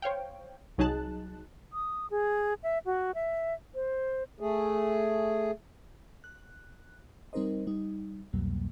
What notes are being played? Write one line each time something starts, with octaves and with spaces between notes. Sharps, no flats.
C5 C#5 F5 G5
C2 F#3 D#4 G#4 A5 F#6
D#6
G#4
E5
F#4
E5
C5
A3 G#4
F#6
G3 C4 D#4 A#4 C5 D#5
G3 D#4
C2 F2 B2 F#3 G3 A#3